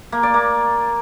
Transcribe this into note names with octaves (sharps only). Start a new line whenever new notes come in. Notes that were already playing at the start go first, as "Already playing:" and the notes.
A#3
D5
A#3